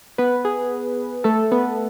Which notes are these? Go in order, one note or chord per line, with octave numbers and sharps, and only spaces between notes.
B3 B4
G#4
A3 A4
B3 B4